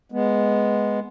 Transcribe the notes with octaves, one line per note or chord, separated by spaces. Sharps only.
G#3 B3